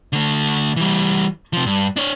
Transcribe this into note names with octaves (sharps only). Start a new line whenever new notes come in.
D3 A3
E3 G3
C3 F3
G2
D4 C#5